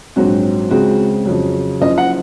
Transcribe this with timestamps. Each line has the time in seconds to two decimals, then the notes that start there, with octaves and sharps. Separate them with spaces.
0.16 A#1 G#2 F#3 C4 F#4
0.71 C#2 C#3 G#3 C4 F#4
1.25 F2 C#3 F#3
1.80 F#1 F#2 F3 D#5
1.98 F#5